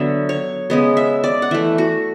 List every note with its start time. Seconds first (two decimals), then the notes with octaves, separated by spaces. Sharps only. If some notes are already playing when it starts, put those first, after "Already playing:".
Already playing: D3 F#3 B3 E5 F#5
0.29 C#5
0.70 C#3 G#3 B3
0.97 E5
1.24 D5
1.42 F#5
1.51 E3 A3 E5
1.78 F#4